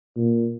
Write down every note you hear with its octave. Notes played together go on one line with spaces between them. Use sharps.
A#2